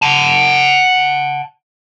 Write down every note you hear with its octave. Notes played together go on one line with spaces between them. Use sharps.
F#5 A5